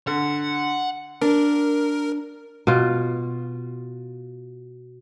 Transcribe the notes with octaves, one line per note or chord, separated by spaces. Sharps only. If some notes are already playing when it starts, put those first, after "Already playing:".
D3 F#5
D4 A#4
B2 F4